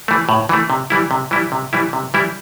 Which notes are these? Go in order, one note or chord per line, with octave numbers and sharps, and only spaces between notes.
E3 A3
A2
E3 A3
C3
E3 G3 E4
C3
E3 G3 E4
C3
E3 G3 E4
C3
E3 G3 E4